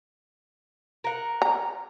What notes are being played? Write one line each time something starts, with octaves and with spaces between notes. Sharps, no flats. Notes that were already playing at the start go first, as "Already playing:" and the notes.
A#4 F#5
A#5